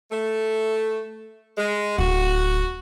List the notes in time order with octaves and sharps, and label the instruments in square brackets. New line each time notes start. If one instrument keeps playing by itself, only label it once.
[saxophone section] A3
G#3
[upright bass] D1 [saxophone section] F#4